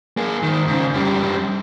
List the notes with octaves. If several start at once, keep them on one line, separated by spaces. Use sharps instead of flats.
A#3 G#4
G#2 D#3
G#2 C#3
F#2 G3